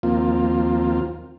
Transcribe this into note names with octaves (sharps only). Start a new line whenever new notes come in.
D#2 F3 A#3 C4 F4